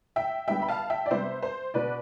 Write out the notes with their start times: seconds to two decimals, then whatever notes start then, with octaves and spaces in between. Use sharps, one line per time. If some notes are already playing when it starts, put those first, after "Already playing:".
0.16 E5 G5
0.47 D3 G3 B3 E5 G5
0.62 B5
0.69 F5 A5
0.90 E5 G5
1.06 D5
1.11 C3 G3 B3 D4 C5 E5
1.42 C5
1.74 B2 B3 D4 B4 D5